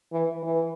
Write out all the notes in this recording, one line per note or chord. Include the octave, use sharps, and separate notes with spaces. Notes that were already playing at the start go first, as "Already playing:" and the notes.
E3
E3